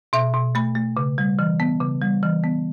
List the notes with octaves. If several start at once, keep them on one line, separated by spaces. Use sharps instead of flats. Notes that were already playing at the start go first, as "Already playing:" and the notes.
B2 E5
B2
A3 B5
A3
C#3
G3
E3
B3
C#3
G3
E3
B3